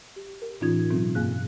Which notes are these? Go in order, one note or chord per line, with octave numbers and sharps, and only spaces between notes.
G4
A#4
A2 E3 C#4 D#4 F4 G#6
B2 F#3 C4 D#4
G2 A#3 G#4 F5 F#6